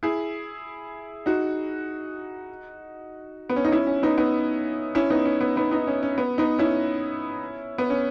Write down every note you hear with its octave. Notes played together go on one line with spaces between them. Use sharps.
E4 G#4
D#4 F#4
B3
C#4
D#4
C#4 E4
C#4
B3 D#4
B3 D#4
C#4 E4
B3 D#4
C#4
B3
B3 D#4
B3 D#4
C#4
C#4
B3
B3 D#4
C#4 E4
B3
C#4